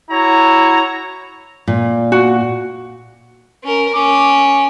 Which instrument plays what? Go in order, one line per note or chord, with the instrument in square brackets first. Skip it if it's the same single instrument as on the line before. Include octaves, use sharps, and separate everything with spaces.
[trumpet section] E4 F#4 C#5 A#5
[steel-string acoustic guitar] A#2
[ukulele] F#4
[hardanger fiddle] C#4 A#4
[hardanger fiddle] C#4 [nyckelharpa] D6